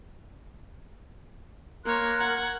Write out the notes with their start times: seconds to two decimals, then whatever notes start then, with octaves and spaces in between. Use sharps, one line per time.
1.85 A#3 A#4 C#5 A#5 C6 F#6
2.20 F#5 G#6